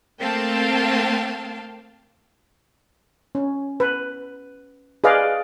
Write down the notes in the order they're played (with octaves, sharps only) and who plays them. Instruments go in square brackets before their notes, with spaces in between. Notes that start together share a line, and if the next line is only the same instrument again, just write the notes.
[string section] A3 A#3 C4 F5 G5 A5
[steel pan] C#4
B4
G#4 B4 D5 D#5 F5